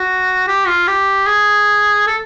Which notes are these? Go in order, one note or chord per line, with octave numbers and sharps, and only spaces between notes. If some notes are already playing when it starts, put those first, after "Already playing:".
Already playing: F#4
G4
F4
G4
G#4
A4